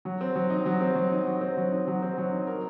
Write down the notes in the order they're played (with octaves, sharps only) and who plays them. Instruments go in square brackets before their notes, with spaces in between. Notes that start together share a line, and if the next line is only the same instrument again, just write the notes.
[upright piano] F#3
C4
F#3
D#4
F#3
C4
F#3
D#4
F#3
C4
F#3
D#4
F#3
C4
F#3
D#4
A#4